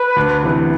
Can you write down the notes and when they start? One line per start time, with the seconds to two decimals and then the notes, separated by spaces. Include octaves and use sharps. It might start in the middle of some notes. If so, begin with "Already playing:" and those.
Already playing: B4
0.16 D2
0.43 C3 E3 B3